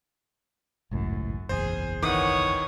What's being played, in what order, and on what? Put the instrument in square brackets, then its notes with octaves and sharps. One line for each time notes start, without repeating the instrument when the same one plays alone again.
[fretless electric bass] G#1 C#2 A2 [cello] F#2
[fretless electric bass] F#1 B1 E2 [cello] G#4 [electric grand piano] C5
[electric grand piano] D#3 E3 [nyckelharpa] C#5 D#6 [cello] F#5